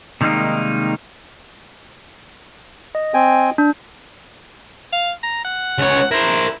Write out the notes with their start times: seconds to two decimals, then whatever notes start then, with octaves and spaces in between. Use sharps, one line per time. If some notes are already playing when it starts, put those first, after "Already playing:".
0.21 C3 D#3 G3 G#3 A#3 D#4
2.95 D#5
3.14 C4 G5 G#5
3.58 D4
4.92 F5
5.23 A#5
5.44 F#5
5.78 C#2 C#5
6.11 E4 A#4 C5